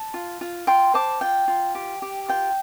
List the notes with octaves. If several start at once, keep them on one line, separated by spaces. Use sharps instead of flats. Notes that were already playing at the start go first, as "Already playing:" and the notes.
Already playing: A5
F4
F4
F4 G5 C6
C5 A5 D6
F4 G5
F4
G4
G4
F4 G5